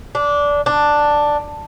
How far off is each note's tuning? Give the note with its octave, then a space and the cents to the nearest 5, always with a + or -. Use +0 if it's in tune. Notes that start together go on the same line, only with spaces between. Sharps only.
D4 -15
D4 +5